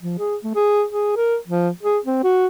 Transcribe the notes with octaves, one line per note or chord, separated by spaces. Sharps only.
F3
G#4
A3
G#4
G#4
A#4
F3
G#4
C4
F#4